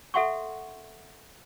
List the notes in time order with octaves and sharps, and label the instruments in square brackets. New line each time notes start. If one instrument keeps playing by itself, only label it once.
[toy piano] A4 E5 F#5 C6 C#6